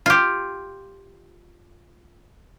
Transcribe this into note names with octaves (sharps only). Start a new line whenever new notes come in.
F4 G4